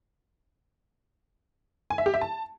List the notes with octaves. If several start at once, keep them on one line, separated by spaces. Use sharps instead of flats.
G#5
E5
G4
E5
A5